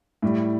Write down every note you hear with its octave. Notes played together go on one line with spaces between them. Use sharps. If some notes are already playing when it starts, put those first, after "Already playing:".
A2 G3